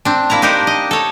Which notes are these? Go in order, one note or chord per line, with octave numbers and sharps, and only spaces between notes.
C4 D4
A#3 E4 A5 A#5
D4 D#4 G4 A#4 C5
D#5
A4 C#5